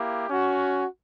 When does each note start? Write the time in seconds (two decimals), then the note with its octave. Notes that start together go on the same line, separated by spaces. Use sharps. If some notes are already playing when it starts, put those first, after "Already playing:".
Already playing: A#3 E4 G4
0.29 C#4 F#4